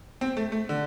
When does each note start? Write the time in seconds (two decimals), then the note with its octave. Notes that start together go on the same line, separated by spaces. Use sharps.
0.21 C4
0.37 A3
0.52 A3
0.69 D3